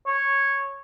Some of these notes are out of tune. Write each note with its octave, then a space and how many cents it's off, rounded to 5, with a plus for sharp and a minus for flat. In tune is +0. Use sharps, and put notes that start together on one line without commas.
C#5 -10